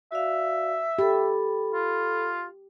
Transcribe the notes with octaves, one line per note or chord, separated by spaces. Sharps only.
F#4 D5 E5 F5
G4 A4 B5
F4